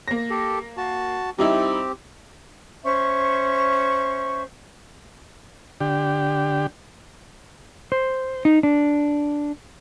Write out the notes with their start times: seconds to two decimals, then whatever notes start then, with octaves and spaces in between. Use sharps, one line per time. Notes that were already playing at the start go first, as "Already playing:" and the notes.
0.08 A#3 A#6
0.30 G4 A4
0.77 F#4 A5
1.39 G3 C4 D#4 E4 G4
2.83 C#4 C5 E5 C#6
5.81 D3 G4
7.92 C5
8.45 D#4
8.63 D4